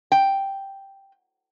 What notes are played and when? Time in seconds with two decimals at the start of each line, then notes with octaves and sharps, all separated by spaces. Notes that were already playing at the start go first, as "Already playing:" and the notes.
0.12 G5